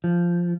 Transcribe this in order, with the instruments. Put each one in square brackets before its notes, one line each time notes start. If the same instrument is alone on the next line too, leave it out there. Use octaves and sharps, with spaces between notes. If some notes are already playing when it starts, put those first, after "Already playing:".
[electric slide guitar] F3